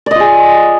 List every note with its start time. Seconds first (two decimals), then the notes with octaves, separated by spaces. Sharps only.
0.06 D5
0.11 D#5
0.15 F4
0.20 G#4